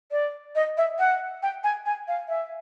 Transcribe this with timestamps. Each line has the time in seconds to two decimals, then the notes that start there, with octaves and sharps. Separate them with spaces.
0.11 D5
0.55 D#5
0.77 E5
0.99 F#5
1.43 G5
1.64 G#5
1.86 G#5
2.08 F5
2.28 E5